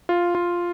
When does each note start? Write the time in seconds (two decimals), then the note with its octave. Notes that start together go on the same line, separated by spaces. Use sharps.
0.09 F4
0.35 F4